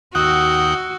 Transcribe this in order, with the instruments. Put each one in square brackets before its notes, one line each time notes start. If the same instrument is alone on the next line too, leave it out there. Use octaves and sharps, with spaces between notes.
[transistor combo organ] D#2 F#5 G5 [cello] F#4 [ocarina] D#6 [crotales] E6 F#6